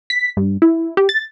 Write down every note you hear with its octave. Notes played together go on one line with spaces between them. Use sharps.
B6
G2
E4
G4
A6